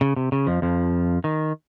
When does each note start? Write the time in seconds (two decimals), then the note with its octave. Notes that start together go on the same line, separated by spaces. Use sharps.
0.01 C#3
0.16 C3
0.32 C#3
0.47 F2 F3
0.62 F2 F3
1.24 D#3